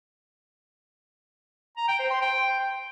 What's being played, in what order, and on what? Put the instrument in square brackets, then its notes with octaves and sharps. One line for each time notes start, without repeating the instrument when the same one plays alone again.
[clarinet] A#5
G5
C5
C6
G5